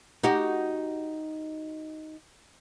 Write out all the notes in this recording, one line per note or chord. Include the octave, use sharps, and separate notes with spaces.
D#4 F#4 G4